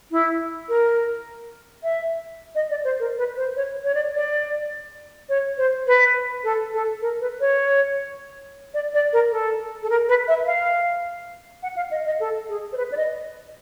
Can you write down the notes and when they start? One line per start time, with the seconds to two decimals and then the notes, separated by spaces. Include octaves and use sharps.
0.11 E4
0.69 A#4
1.83 E5
2.55 D#5
2.70 D5
2.84 C5
3.00 A#4
3.18 B4
3.37 C5
3.56 C#5
3.84 C#5
3.95 D5
4.14 D5
5.29 C#5
5.58 C5
5.87 B4
6.44 A4
6.74 A4
7.02 A#4
7.21 B4
7.40 C#5
8.74 D5
8.94 D5
9.13 A#4
9.32 A4
9.83 A4
9.90 A#4
10.09 B4
10.28 E5
10.47 F5
11.63 F#5
11.76 F5
11.91 D#5
12.06 D#5
12.20 A4
12.49 G#4
12.73 C5
12.77 B4
12.92 D5
12.97 D#5